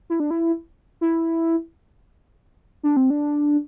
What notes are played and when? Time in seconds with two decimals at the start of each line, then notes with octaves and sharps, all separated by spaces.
0.10 E4
0.20 D4
0.31 E4
1.01 E4
2.83 D4
2.97 C4
3.10 D4